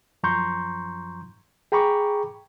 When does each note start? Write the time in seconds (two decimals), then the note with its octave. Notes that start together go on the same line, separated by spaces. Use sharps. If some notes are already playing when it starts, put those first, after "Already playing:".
0.23 F#2 F3 A#5 C6 C#6 G6
1.72 G#4 G5 A#5 B5 C#6 D6